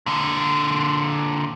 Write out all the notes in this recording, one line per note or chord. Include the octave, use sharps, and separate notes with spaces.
A#2 D3